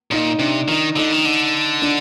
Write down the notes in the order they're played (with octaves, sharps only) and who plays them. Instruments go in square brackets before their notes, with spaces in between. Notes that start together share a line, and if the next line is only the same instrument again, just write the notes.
[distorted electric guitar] A#2 [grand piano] D#4
[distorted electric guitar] C3 [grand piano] D4
[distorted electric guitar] D#3 [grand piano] D#4
[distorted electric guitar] D3 [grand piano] D#4
[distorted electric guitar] D#3
D3
[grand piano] D4